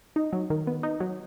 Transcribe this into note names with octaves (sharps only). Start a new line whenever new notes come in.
D#4
F#3
D#3
B3
D#4
F#3